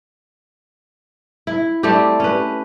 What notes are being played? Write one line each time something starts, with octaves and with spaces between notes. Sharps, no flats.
E4
G3 A3 C4 G4
C#4 B4